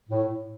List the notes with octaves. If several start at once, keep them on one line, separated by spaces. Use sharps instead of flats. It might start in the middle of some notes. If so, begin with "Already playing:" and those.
A2